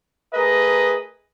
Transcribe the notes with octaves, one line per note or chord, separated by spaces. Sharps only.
A3 G#4 A#4 B4 D#5